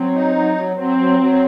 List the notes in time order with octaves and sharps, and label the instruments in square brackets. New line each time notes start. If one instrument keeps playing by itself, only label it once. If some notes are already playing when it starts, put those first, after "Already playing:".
Already playing: [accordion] F#3 [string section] C4
[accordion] D#4
F#3
F#3
[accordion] F#3 [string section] C4
[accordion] F#3
F#3